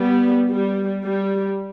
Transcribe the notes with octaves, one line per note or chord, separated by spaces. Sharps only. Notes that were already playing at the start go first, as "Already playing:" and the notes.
Already playing: G3 B3
G3
G3